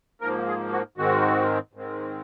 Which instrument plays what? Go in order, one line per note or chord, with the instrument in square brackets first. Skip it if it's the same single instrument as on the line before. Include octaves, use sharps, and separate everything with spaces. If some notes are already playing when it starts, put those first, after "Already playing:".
[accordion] G#2 F3 A#3 A#4
G#4
F#4
G#2 D#3 G#3 C4 F#4
G#2 D#3 G#3 C4